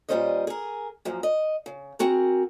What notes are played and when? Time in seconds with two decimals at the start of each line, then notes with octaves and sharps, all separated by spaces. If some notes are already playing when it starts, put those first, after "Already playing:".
0.09 A#2 E3 G3 C#4 C5 D#5
0.47 G#4 A#4
1.05 F#2 A#2 F3
1.23 D#5
1.66 C#3
1.99 C4 F#4 G#4 A#4